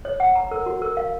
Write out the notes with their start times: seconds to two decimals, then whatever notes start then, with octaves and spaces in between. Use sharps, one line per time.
0.05 C#5
0.20 F#5
0.35 A#5
0.51 A#4
0.66 F#4
0.82 A#4
0.97 F5